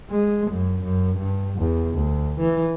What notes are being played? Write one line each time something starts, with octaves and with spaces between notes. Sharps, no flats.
G#3
F#2
F#2
G2
E2
D2
E3